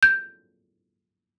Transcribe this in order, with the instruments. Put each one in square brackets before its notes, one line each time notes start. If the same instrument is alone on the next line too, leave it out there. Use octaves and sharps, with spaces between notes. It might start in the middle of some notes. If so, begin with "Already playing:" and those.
[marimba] G6